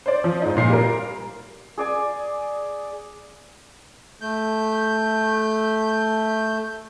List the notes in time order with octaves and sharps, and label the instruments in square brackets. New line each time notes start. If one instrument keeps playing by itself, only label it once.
[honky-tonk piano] C5 D5
F3
G#2 D#4
A#2 C7
G3 A#4
[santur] G#4 D5 G#5
[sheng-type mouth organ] A3 G6